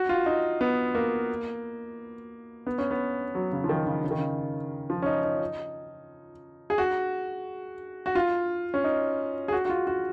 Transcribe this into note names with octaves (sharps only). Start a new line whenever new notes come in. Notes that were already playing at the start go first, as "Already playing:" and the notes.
Already playing: F#4
F4
D#4
B3
A#3
B3
C#4
B3
F#3
C#3
F3
D#3
C#3
C#3
D#3
C#3
F3
C#4
D#4
D#4
G#4
F#4
F#4
F4
C#4
D#4
G#4
F#4
F#4
F4
F#4